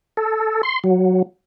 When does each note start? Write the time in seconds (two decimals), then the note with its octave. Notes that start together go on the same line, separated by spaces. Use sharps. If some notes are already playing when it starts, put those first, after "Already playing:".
0.17 A4
0.63 C6
0.84 F#3